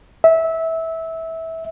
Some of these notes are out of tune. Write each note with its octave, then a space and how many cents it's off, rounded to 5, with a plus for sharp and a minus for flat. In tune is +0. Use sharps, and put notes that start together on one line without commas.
E5 -20